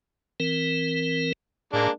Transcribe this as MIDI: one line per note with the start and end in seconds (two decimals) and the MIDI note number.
0.40 1.33 52
0.40 1.33 60
0.40 1.33 70
1.73 1.88 45
1.73 1.89 56
1.73 1.89 58
1.73 1.89 62